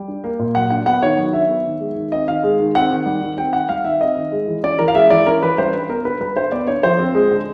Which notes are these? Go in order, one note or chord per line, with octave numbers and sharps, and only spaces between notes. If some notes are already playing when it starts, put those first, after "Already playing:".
Already playing: G3 G5
D4
A#3
A#2
F#3 F#5
D4 F#5
B3 F#5
D#3 C#5
F#3
D4 E5
B3
D#3
G#3
D#3
C4 D#5
D#3 F5
G#3
D#3
C4 F#5
D#3
G3
D#3
C4 G5
D#3 F#5
G3 F5
D#3 E5
C4 D#5
D#3
G#3
E3
C#4 D5
E3 A#4
F5
G#3 E5
E3 D5
C#4 A#4
E3 B4
G3 C5
D4 B4
B3 A#4
D3 B4
G3 B4
D4 C5
B3 D5
D3 C#5
F3 C5
C4
G#3
D3